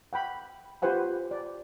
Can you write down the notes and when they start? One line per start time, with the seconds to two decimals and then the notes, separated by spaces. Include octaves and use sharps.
0.13 F#5 G5 B5
0.82 F4 G4 B4 C5 F#5 G#5
1.31 D5